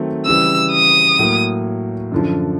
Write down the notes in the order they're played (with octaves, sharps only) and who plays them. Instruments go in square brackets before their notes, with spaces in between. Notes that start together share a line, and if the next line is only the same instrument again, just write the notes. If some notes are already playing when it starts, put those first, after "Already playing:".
Already playing: [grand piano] D#3 F#3 A3 C4
[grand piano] C#3 E3 G3 [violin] E6
[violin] D#6
[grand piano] A2 F#3 A#3
F#2 D3 F3